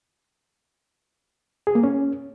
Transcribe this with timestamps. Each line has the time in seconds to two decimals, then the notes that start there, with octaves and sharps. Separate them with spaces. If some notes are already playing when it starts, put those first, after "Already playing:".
1.67 G#4
1.75 A#3
1.84 C#4